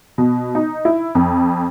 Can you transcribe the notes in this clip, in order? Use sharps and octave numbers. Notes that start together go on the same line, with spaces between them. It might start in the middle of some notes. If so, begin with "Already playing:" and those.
B2
D#4
E4
F2